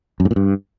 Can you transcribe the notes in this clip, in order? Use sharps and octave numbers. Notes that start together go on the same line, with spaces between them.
F#2
G#2
A#2
G2